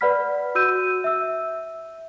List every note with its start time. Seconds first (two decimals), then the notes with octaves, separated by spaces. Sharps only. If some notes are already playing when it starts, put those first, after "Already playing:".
0.01 B4 D5 F#5 B5 F6 B6
0.55 F#4 E6 G6 D#7
1.04 E5 E6